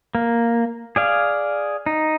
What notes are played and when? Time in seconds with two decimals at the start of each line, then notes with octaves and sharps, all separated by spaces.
0.15 A#3
0.96 G#4 D5 F5
1.86 D#4